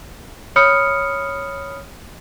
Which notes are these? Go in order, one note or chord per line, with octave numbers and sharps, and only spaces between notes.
C#5 B5 D#6 F6 C#7